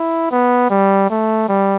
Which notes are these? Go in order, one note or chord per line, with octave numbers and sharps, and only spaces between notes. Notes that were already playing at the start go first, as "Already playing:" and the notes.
Already playing: E4
B3
G3
A3
G3